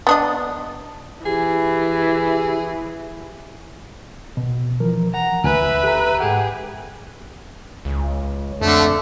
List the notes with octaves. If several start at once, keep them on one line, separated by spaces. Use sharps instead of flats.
B3 D4 D#5
E3 G4 G#4
B2
E3 F3 A#4
F#5 A#5
D2 B4 E5 G#5
G4 A4 A#5
G#2 G4 G#4 F#5
C#2
F2 D3 A3